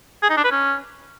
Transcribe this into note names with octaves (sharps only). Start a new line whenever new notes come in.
G#4
D#4
D4
B4
C#4